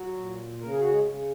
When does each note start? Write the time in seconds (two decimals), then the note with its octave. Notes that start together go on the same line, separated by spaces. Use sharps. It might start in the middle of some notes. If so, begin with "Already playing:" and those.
Already playing: F#3 F#4
0.17 A#2
0.60 C#3 A#4
0.70 G#4
0.81 F#4
0.90 G#3 G#4
1.05 C#3